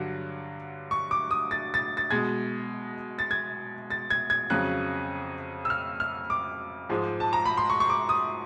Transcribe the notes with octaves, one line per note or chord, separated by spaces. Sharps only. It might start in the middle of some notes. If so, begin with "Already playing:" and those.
Already playing: G2 D3 F#3
C#6
D6
D#6
A6
A6
A6
B2 G#3 G#6
A6
G#6
A6
G#6
G#6
F2 C#3 F#3 F#6
E6
F6
F6
D6
G#2 F3 G#3
A5
A#5
B5
C6
C#6
C#6
D6
D#6